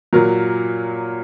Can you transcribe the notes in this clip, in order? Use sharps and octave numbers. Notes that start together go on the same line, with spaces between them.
A#2 F#3 A#4